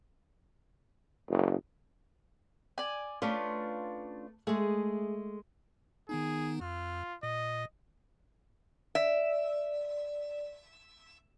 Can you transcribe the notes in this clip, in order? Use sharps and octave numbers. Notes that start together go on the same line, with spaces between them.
F#1
D5 G#5
A3 C#4 D4 F4 B4
G#3 A3 G#4
D#3 B3 D#4 G#4
F2 F4
A#2 D#5
D5 E5